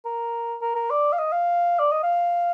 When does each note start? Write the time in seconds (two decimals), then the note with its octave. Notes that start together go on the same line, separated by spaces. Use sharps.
0.05 A#4
0.61 A#4
0.76 A#4
0.90 D5
1.13 F5
1.19 D#5
1.32 F5
1.79 D5
1.92 D#5
2.03 F5